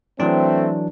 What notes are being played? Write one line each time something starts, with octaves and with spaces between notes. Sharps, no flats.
E3 F#3 A3 C4 D4